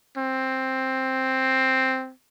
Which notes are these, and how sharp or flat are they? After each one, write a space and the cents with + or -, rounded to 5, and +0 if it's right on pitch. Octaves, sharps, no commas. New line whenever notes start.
C4 +5